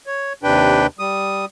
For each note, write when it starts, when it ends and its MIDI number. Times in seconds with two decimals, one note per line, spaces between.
0.07 0.33 73
0.43 0.87 39
0.43 0.87 48
0.43 0.87 62
0.43 0.87 71
0.43 0.87 79
0.99 1.45 55
0.99 1.45 87